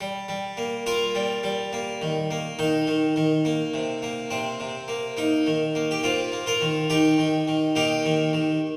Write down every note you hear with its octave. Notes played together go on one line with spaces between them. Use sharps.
G3
G3
A#3
A#3 F4 A#4
G3
G3
A#3
D#3
A#3
D#3 D#4
D#3
D#3
A#3
C3
A#3
C3 C4
C3
A#3
A#3 D#4
D#3
A#3
G4
A#3 C4 F4
A#3
F4 A#4
D#3
D#3 D#4 G4
D#3
D#3
A#3 D#4 G4
D#3
D#3